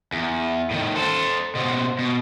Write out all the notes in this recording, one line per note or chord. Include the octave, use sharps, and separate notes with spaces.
E2
A2 D#3
A4 C5
B2 C4
B2